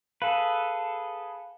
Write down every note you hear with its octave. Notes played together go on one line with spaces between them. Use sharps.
G#4 A4 B4 F5